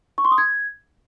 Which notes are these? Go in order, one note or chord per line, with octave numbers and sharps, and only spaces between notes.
C#6
C6
D#6
G#6